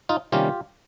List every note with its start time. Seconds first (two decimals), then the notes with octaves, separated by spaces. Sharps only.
0.09 D#4 F4
0.32 C3 D#3 G3 A#3 C#4 F4 G4